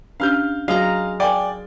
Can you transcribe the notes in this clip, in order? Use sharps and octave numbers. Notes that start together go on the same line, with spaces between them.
C#4 D4 G4 F5 F6 G6
F#3 G#3 F#4 F5 A#5
A#4 D5 F5 G5 G#5